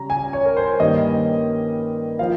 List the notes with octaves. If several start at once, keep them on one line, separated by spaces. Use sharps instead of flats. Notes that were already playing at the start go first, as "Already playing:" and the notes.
Already playing: C#3 G3 C#4 A#5
G#5
C#5
A#4
C5
G2 D#3 G3 A#3 D#5
F3 F5